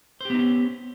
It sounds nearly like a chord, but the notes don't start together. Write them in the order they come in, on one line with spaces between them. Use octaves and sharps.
C5 G4 B3 D#4 C#4